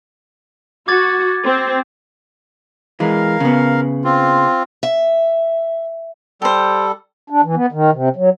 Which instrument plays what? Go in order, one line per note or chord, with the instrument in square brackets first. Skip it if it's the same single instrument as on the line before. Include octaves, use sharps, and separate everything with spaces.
[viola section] F#4 [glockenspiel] D6 G#6 A6
[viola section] C4
[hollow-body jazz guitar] E3 G#3 [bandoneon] A#4 F5
[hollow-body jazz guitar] C#3 B3
[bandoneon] C4 F4
[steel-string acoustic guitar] E5
[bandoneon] G3 A4 [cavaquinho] G4 C5
[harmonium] D4
E3
B3
D#3
C3
F#3